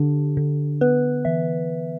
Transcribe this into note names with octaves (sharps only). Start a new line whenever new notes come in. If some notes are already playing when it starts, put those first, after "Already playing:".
Already playing: D3 D4 G4
D3
B3 B4
E3 E5